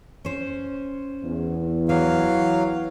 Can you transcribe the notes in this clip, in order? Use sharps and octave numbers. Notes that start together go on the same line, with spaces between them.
C#4 C5
E2
E3 F#3 F5